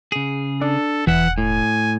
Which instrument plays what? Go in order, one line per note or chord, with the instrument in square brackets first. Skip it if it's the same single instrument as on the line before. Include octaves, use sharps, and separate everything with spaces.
[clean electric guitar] C#3 G#4
[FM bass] D4 [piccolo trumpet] A4
[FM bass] E1 [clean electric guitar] E3 E5 [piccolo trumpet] F#5
[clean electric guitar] A2 [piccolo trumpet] G#5